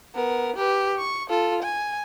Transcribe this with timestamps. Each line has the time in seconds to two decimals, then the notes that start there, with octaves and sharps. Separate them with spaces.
0.15 B3 A#4
0.56 G4 B4
0.98 C#6
1.29 F4 A4
1.63 G#5